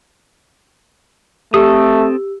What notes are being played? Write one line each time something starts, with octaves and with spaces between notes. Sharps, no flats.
A3 C4 G4 A4 D#6 E6